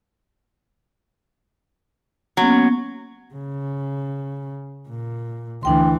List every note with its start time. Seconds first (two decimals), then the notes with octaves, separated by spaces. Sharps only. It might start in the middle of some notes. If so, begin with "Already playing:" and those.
2.37 F#3 A#3 B3 C#4
3.34 C#3
4.89 A#2
5.63 D2 E3 D4 G5 C6